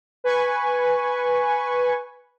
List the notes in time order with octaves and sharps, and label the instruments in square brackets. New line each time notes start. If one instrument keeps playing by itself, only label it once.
[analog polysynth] B4 G#5 C#6